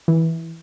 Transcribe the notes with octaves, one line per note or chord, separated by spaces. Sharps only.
E3